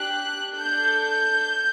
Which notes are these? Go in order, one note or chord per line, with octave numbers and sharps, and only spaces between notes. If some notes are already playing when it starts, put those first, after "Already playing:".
Already playing: D4 G4 F#6
D4 A4 G6
G6